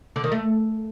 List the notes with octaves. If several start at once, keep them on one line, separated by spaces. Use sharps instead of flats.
D3
D#3
A3